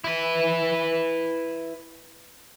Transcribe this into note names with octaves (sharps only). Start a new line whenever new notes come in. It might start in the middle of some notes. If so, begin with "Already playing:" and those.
E4 B4